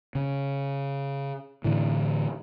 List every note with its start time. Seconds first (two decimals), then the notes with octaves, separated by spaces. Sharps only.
0.15 C#3
1.64 A2 D3 E3